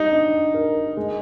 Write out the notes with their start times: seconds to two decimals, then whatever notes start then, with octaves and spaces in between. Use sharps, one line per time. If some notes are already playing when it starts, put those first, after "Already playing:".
Already playing: G3 D#4
0.12 D4
0.54 A#4
0.97 G#3